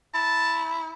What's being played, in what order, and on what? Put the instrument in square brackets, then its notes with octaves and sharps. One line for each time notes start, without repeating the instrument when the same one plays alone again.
[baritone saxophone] E4 [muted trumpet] A5